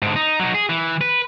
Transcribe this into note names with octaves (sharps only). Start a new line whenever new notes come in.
G#2 D3
D#4
F#3 D#4
G#4
E3
B4